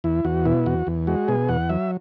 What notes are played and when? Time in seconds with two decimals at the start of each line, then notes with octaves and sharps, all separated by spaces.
0.04 E2 E4
0.25 E2 F#4
0.45 B2 E4
0.66 E2 F#4
0.87 E2
1.07 G#3 F#4
1.28 B2 G#4
1.48 E2 F#5
1.69 F#3 E5